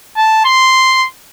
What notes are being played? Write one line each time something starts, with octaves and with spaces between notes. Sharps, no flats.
A5
C6